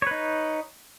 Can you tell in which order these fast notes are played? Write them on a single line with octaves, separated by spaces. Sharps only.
C#5 B4 D#4